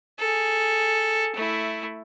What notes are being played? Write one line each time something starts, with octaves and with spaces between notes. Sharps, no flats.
G#4 A4
A3 E4